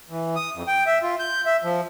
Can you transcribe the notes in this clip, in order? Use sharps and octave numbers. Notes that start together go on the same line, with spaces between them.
E3
D#6
F2
G5
E5
F4
G6
E5
F3